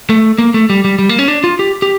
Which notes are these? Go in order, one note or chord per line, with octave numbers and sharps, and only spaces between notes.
A3
A#3
A3
G3
G3
G3
A#3
C#4
D4
F4
G4
G4